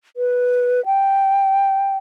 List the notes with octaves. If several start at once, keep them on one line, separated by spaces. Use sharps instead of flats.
B4
G5